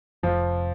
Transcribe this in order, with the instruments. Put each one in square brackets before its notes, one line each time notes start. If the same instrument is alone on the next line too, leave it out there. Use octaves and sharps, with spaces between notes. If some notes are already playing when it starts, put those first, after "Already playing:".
[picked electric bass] F1 [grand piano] F3